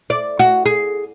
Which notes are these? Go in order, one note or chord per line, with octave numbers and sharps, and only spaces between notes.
D5
F#4
G#4